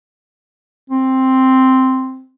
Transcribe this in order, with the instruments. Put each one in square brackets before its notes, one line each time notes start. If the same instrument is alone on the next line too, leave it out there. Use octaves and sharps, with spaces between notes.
[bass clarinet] C4